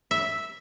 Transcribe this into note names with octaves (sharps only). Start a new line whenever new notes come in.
E5